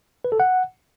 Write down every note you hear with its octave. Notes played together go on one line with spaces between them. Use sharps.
B4
A4
F#5